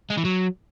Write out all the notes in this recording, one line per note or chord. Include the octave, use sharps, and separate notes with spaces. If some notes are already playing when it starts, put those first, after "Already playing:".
G#3
E3
F#3